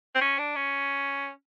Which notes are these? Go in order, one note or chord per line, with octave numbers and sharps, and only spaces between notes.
C4
C#4
D4
C#4